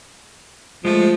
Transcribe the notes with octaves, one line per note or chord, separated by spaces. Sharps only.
F3 G#3 A3